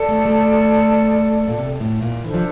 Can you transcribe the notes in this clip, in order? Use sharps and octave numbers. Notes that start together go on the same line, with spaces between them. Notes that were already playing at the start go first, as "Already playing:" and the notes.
Already playing: A4 D5 A5
A3
A3
A#2
C3
A2
A#2
E3 D4 A4 C5 E5
F3